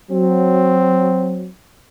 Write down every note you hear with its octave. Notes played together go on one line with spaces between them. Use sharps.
F#3 C4